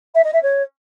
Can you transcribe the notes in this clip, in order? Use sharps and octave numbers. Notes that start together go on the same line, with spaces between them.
E5
D#5
E5
C#5